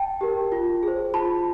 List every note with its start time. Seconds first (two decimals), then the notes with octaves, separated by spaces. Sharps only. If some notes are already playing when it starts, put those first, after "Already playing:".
Already playing: G5 A5
0.21 G4 A#4
0.52 F4
0.83 G#4 C5
1.14 F4 A5 B5